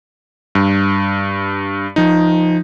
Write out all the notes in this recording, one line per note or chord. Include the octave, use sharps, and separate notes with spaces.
G2
F3 D#4